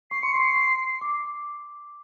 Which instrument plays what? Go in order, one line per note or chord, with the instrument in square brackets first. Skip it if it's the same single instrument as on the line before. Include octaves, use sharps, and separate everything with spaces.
[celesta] C#6 [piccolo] C7
[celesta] C6 [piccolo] C#7
[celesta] C#6 [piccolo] C7
[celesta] C6
D6